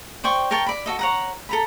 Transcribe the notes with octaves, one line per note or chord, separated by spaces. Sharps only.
C5 D5 G5 C#6
A#4 C#5 G5 A5
D5 B5
F#4 A4 D#5
C#5 F#5 A#5
A4 A#5 B5